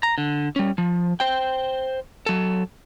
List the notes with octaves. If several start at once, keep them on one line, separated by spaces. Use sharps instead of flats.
A#5
D3
G3 C#4
F3
C5 G5
F#3 A4